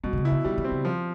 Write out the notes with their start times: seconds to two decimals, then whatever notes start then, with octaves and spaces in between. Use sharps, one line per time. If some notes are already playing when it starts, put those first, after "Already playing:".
0.04 B2 G3
0.13 C3
0.18 C#3
0.25 E4
0.32 D3
0.45 D#3 G3
0.58 E3
0.64 C4
0.72 C#3
0.85 F3